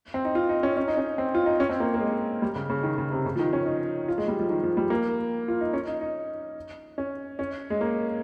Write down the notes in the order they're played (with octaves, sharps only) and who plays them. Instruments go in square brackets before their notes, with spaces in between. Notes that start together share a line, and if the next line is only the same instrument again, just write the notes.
[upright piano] C4
D#4
F4
D#4
C#4
C#4
D#4
C#4
C4
F4
D#4
C#4
C4
A#3
A#3
G#3
G3
C#3
C#3
D#3
C#3
C3
C#3
F3
D#3
C#4
D#4
F4
G#3
G3
F3
D#3
F3
G3
A#3
F4
D#4
C#4
D#4
D#4
C#4
C#4
G#3
A#3